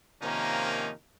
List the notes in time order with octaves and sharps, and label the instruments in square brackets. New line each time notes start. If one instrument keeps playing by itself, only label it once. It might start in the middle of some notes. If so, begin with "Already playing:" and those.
[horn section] C3 D#3 F3 A#3 C#4 D#4